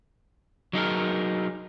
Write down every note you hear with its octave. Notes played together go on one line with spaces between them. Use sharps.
F#3 D#4 G#4 A#4